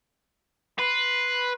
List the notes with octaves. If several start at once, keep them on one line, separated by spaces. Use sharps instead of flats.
B4 C6